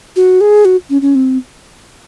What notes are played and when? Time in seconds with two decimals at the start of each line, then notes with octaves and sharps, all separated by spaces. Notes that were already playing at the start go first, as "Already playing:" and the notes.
0.16 F#4
0.41 G#4
0.65 F#4
0.90 C#4
1.02 C#4
1.15 C4